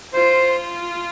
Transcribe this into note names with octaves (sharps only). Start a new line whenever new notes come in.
F4 C5